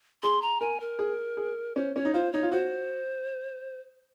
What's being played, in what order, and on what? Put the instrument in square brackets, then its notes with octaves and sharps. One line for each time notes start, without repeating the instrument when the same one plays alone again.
[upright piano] G#4 [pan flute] C6
[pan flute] A#5
[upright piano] A#4 [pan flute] G#5
[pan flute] A#4
[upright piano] G#4
G#4
[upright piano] C#4 [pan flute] C5
[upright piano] C#4 [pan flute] C#5
[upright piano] D#4
[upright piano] F4 [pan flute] C5
[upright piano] D#4 [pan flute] C#5
[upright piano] F4
[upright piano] F#4 [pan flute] C5